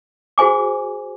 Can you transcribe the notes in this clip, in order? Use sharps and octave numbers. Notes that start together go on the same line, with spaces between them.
F#4 G#4 C5 G#5 D6